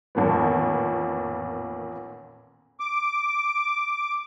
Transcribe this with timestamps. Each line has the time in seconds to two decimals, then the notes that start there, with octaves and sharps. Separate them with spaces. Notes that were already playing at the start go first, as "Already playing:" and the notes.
0.15 A1 F2 A#2 D#3 B3
2.80 D6